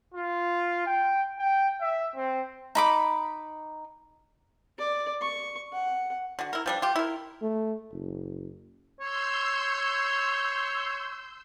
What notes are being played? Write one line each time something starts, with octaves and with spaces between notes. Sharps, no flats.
F4
G5
G5
E5
C4
D#4 B5 D6
D5
C#6
F#5
D3 F#4
E4 A#4
F3 G3 D4
F4 G4
E4 A#4
A3
F#1
C#5 C6 E6 G6